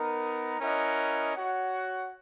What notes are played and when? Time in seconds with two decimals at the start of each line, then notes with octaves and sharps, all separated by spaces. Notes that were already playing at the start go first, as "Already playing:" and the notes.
Already playing: B3 D#4 A#4
0.60 C#4 E4 A#4 D#5 F#5
1.35 F#4 C#5 F#5